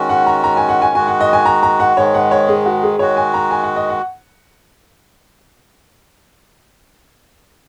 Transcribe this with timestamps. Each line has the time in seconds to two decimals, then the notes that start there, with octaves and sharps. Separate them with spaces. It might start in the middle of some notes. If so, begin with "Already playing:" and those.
Already playing: D#3 G#3 C#4 F#4
0.09 F#5
0.27 A#5
0.44 A#5
0.57 G#5
0.69 F#5
0.82 G#5
0.95 D#3 G#3 F#4 G#5
1.08 F#5
1.21 D#5
1.33 G#5
1.46 A#5
1.63 A#5
1.80 F#5
1.97 G#2 D#3 G#3 C#5
2.14 F#5
2.31 C#5
2.48 G#4
2.66 F#4
2.83 G#4
2.99 D#3 G#3 F#4 C#5
3.17 G#5
3.34 A#5
3.51 G#5
3.64 F#5
3.76 D#5
3.89 F#5